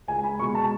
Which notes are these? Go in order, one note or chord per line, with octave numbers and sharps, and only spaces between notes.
C#2 G#5
B5
B2 G#3 C#6
A5